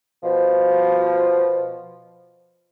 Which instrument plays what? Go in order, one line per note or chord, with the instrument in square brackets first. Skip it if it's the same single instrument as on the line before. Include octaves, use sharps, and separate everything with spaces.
[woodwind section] B2 F3